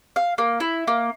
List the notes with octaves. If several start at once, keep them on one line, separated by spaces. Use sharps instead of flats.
F5
A#3
E4
A#3